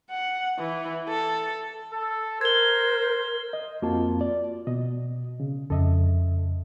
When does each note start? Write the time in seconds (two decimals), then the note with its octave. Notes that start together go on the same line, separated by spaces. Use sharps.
0.10 F#5
0.59 E3
1.09 A4
1.93 A4
2.41 A#4 C5 G#6 G7
3.53 D#5
3.82 F2 A#3 C4 F4 F#4 A5
4.21 D5
4.67 B2 D#5
5.40 C#3
5.70 F2 C#3 A4 D#5 E5